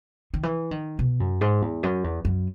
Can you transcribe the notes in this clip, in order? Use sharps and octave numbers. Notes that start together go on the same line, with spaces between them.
D#3
E3
D#3
B2
F#2
G#2
E2
F#2
E2
F#2